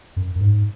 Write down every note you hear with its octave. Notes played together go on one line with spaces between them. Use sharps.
F#2
F#2
G#2